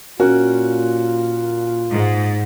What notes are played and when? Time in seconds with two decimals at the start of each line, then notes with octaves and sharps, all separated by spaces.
0.20 A#2 C#4 F4 F#4 A#4
1.90 G#2